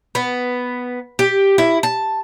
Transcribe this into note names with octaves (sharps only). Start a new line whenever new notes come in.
B3
G4
E4
A5